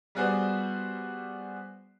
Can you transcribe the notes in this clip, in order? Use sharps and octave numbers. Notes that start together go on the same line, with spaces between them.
G3 B3 F#4 G#4 C5 D5